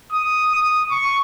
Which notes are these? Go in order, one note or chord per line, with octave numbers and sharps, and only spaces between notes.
D#6
D#6
C#6